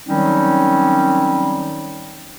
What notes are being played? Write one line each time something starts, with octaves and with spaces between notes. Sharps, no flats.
D#3 F#3 G3 C4 C#4 D#4